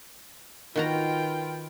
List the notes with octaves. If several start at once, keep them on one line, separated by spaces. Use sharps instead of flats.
D#3 F4 F#4 B4 G5 A#5